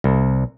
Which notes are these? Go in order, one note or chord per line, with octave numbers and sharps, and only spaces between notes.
C2